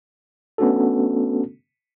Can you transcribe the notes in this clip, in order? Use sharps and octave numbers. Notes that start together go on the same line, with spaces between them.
A3 B3 C#4 D4 F#4 A4